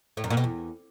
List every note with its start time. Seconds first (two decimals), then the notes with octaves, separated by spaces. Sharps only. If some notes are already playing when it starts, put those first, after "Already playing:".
0.17 A2
0.24 F#2
0.30 A#2
0.37 B2
0.44 E2